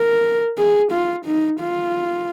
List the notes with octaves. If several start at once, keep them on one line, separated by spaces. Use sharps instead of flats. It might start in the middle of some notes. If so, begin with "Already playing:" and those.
Already playing: A#4
G#4
F4
D#4
F4